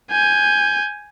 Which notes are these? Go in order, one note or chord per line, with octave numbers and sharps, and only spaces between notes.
G#5 G6